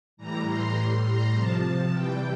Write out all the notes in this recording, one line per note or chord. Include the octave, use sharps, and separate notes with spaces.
A2 E3 G3 A#5
C6
A2 G3 C6
A#5
C3 F3 A5
C3 E3 G3 G5